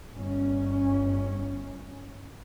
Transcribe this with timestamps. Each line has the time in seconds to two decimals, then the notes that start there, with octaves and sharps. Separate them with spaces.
0.15 G1 C#4